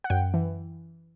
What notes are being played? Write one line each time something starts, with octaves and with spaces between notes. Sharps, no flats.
F#5
F#2 G5
E3